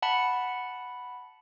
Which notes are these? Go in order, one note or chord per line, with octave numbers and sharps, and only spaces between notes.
F#5 A5 B5 C#7